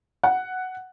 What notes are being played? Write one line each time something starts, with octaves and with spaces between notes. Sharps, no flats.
F#5